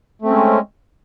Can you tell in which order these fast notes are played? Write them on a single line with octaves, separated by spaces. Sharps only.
A3 C4 C#4 G#3